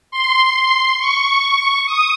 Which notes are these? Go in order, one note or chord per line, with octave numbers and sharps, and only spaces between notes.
C6
C#6
D#6